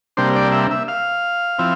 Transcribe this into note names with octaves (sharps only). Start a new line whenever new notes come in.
C3 G3 A#3 D4 C5
D5
E5
E5
F5
F3 C4 E4